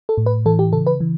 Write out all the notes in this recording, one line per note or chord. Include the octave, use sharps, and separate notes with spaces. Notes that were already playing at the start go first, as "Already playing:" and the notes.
A4
A2
B4
E3 A4
G4
C#3 A4
B4
E3